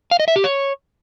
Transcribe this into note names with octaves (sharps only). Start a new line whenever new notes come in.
F5
D#5
E5
G4
C#5